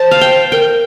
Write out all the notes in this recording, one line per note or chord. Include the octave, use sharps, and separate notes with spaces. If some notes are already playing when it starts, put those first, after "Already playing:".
Already playing: C5 A5
F5
G5
A#4 G5